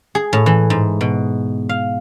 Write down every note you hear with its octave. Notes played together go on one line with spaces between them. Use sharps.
G#4
A2
E3
G#2
B2
F5